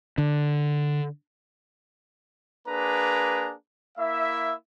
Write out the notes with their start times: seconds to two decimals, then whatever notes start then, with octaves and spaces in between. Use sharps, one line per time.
0.18 D3
2.67 A#3 D4 G#4 B4 A#5
3.98 A#3 E4 E5